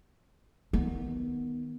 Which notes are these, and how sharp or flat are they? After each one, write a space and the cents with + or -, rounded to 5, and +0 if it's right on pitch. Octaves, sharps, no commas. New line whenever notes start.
D#3 +0 B3 -10